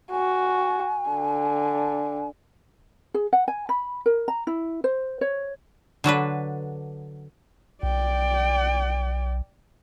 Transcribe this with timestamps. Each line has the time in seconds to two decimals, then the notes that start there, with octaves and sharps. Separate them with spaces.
0.12 F#4 G#5
1.10 D3
3.14 G#4
3.33 F#5
3.48 G#5
3.69 B5
4.06 A#4
4.28 A#5
4.47 E4
4.84 C5
5.21 C#5
6.04 D3 F#3 D4 B4
7.83 B1 D5 G5